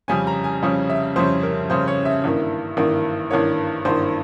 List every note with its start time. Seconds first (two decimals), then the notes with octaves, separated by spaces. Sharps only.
0.08 F2 C#3 G3 C#4 G#5
0.27 A#5
0.44 G#5
0.62 F2 C#3 G3 C#4
0.90 E5
1.16 F2 C#3 G3 C#4 C5
1.43 A#4
1.69 F2 C#3 G3 C#4 C5
1.87 C#5
2.05 E5
2.24 G#1 G2 E3 A#3
2.77 G#1 G2 E3 A#3
3.30 G#1 G2 E3 A#3 C#5
3.85 G#1 G2 E3 A#3 C5